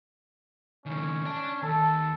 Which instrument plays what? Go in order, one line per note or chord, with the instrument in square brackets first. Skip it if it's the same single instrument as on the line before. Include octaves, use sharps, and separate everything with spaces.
[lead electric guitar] C#2 D#3 [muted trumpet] C#4
[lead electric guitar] D5 A5
[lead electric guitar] D#2 [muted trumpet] A4